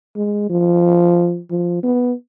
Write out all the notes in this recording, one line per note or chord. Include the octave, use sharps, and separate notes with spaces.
G#3
F3
F3
B3